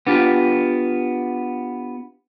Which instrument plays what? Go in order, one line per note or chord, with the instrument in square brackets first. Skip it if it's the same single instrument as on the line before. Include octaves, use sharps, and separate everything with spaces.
[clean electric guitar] B3 D4 F4 G4